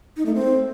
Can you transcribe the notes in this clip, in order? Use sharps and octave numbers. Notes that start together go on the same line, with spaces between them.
D#4
A3
C4